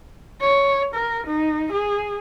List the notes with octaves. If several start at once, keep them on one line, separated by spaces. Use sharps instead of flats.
C#5
A#4
D#4
G#4